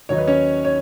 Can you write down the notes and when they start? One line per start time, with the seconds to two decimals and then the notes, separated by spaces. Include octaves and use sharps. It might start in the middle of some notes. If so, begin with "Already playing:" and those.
0.09 D#2 D#3 F#3 D#4 C#5
0.18 B4
0.27 C#4 C#5
0.65 C#5